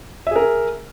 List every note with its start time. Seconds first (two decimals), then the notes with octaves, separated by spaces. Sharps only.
0.27 E5
0.31 G#4
0.36 A#4